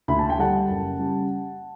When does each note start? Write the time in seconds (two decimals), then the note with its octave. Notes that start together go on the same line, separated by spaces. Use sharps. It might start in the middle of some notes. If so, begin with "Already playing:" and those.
0.08 D2 B5
0.19 A5
0.30 G5
0.38 D3 G3 D4 F#5 A5
0.68 F#1
0.99 C#3 G3